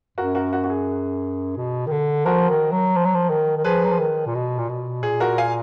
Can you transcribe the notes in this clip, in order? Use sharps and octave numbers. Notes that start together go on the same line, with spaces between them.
F#2 F#4 A#4
F#4 A#4
F#4
F#4
G#4
B2
D#3
D3
F3 F#4 A#4
D#3
F#3
F3
F#3
F3
D#3
D#3
F3 G#4 B4
F#3
F3
D#3
A#2
B2
A#2
B2
A#2 G#4
F#4 A#4
F5 G#5